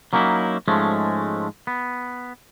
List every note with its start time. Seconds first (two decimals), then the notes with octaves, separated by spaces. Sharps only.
0.13 F#3 A#3 C#4 D#4 E4
0.68 G#2 F3 G#3 A3 C#4
1.67 B3